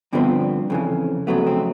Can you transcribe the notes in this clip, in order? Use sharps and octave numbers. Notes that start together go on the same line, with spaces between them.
G2 D3 F3 G#3 B3 C4
F2 C#3 E3
F2 C#3 F#3 A3 B3
C4